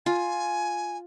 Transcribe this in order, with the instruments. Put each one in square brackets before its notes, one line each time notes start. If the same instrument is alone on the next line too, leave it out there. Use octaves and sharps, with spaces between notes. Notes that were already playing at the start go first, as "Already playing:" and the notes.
[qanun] F4 [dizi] G#5